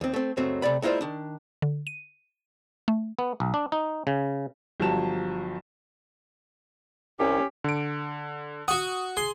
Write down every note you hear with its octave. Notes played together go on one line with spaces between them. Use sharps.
D#2 C4
A3 C4
C#2 F#2 F#3 A3 C4
C3 A3 D5 B5
G#3 A#3 E4 F4 C5 D5
D#3 D4
D3
D#7
A3
B3
B1
D4
D#4
C#3
G1 F3 F#3 G4 A5 E7
C2 C#4 G4
D3 D7
F#4 F#5 D#6
G#4 C6